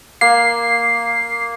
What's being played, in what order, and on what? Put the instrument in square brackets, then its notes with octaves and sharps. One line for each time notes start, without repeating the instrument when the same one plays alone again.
[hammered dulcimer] A#3 [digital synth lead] C7